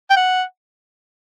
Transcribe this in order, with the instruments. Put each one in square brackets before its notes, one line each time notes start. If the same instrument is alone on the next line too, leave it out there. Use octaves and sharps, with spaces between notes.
[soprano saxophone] G5
F#5